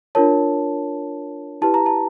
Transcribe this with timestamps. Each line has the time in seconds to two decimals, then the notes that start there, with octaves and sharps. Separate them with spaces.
0.15 D4 F4 A#4 C#5 A5
1.62 E4 G4 B4 A5
1.74 A#5
1.86 A5